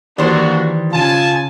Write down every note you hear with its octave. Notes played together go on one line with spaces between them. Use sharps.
D#3 E3 G3 A#3 D4 F#4 C5
C#3 F4 G#5 A5